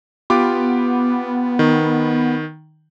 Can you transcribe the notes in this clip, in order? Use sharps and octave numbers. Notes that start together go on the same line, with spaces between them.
B3 F4 G4 D6
D#3